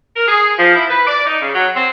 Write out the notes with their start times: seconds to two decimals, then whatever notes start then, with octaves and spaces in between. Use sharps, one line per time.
0.16 A#4
0.28 G#4
0.58 F3
0.75 E4
0.90 B4
1.07 D5
1.27 D#4
1.40 C#3
1.54 F#3
1.76 C4